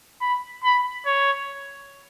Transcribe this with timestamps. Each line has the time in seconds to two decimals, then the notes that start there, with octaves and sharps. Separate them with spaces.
0.21 B5
0.64 B5
1.06 C#5